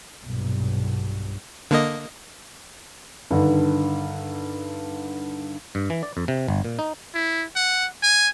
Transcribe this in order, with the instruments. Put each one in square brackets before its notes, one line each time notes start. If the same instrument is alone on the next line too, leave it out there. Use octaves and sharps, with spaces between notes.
[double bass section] B1 G2 A#2
[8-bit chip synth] D3 A#3 D#5
[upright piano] G2 D3 D#3
[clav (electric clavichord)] G2
E3
D5
F2
C3
G1
A#2
D#4
[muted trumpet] E4
F#5
G#5